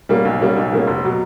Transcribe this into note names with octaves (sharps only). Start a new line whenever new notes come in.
B2 G3 A#3 C#4
B1
B2 G3 A#3 C#4
B1
B2 G3 A#3 C#4
F1
B2 F#3